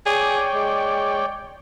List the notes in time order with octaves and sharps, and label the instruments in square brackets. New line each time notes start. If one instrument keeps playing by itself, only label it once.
[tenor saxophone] G#4 [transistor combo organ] C#5 D5 G5
[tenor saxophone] G#3